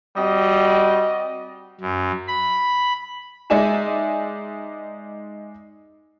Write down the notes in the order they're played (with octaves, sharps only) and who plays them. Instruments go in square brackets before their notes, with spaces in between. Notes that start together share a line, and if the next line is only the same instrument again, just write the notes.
[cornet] G3 [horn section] C4 F#4 D#5
[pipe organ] F#2
B5
[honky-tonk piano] G#3 D#4 D5 E5 G#5 E7